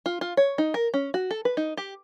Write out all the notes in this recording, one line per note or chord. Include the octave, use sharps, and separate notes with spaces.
F4
F4
C#5
D#4
A#4
C#4
F#4
A4
B4
D#4
G4